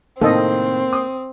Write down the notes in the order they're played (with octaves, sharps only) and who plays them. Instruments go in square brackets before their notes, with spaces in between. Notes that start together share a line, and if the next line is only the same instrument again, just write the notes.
[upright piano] A2 C3 D#3 [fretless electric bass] A#3 [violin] C4 [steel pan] A4 D#5
[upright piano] D#6